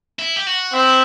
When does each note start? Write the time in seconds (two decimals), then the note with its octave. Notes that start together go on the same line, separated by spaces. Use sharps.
0.19 E4
0.36 G4
0.47 F#4
0.74 C4 E4